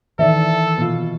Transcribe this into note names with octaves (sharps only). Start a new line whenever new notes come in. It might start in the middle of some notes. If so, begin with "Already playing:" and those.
D#3 E3 A4 D5 E5
B2 F4